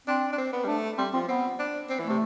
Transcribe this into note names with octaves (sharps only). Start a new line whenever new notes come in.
C4 D4
D4
C4
B3
G3
A3 D4
G3 C4
F3 C4
B3 C4
D4
C4
E3
A3
C3